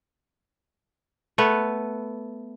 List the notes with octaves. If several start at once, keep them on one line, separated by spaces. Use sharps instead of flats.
A3 B3 B4